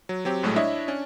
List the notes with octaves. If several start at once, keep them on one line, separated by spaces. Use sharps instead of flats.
F#3
F#3 C4 G4
A#1 A2 F#3 G#3 A3
D4 E4 C#5 D#5 E5
C#4 D4